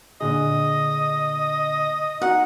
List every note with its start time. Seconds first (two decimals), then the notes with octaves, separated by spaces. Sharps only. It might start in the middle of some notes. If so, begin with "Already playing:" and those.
0.21 A#2 D3 G#4 D#5
2.22 D#4 F#4 F#5